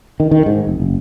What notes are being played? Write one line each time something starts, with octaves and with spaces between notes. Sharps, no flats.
D#3
D#3
G#2
F1
F#1